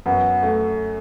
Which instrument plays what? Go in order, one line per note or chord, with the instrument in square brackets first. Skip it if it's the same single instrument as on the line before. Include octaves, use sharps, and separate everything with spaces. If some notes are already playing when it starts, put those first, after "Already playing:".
[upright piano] F#2 [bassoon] B3
[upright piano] A3